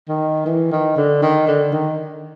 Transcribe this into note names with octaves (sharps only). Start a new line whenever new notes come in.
D#3
E3
D#3
D3
D#3
D3
D#3